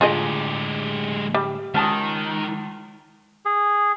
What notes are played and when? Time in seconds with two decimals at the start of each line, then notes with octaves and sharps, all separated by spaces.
0.01 A2 D3 G#3 F4 G4 G#4 D#5 A5
1.34 G3
1.74 C#2 D#3 G#3 A5 D#6
3.45 G#4